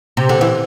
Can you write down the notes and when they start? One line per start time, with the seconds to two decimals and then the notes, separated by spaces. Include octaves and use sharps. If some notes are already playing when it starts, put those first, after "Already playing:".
0.17 C3
0.29 D3
0.41 E3